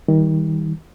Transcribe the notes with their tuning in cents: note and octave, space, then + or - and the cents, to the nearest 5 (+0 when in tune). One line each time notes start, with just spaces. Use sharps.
D#3 +30 G3 +0